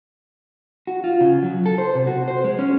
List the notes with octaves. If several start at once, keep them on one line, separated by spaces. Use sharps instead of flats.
F#4
F4
C#3
F#3
A4
C5
C3
F#4
C5
G#3
C#4